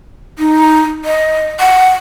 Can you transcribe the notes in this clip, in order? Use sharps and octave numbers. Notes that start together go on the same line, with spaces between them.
D#4
D#5
F#5